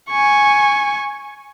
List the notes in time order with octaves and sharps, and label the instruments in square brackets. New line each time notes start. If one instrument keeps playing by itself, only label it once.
[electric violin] G#5 C#6